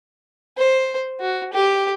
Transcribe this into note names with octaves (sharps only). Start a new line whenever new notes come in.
C5
F#4
G4